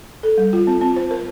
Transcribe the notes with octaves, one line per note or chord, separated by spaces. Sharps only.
A4
G3
F4
C4
C4
C5
A#4